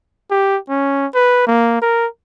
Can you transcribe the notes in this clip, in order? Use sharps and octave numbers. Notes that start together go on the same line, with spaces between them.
G4
C#4
B4
A#3
A#4